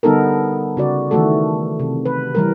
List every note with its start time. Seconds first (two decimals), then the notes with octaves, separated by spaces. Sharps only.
0.03 D3 G3 B3 D#4 A4 A#4
0.77 C#3 F#4 D5
1.11 D#3 E3 A3 F#4 A4
1.80 C3
2.06 B4
2.35 E3 G3 A#4